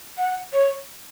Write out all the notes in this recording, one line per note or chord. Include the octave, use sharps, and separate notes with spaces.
F#5
C#5